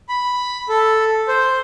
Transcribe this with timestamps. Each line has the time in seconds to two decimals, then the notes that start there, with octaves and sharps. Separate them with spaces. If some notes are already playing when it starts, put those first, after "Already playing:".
0.09 B5
0.69 A4
1.28 C5